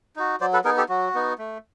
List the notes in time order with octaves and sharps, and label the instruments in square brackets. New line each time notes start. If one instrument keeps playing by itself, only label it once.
[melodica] D#4 F#4
F#3 C5 D5
A4 B4
B3 D#4 G#4 A#4
G4 A4
F#3 F#4
B3 D#4
A3